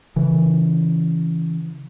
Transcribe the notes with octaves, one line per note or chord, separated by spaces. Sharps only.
C#3 E3